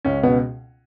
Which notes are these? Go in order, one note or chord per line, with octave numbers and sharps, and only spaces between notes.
C#2 C#4
B2 B3